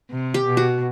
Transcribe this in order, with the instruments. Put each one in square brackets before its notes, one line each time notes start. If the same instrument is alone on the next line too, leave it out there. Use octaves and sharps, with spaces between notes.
[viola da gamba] C3
[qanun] G4
[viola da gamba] B2
[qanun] F#4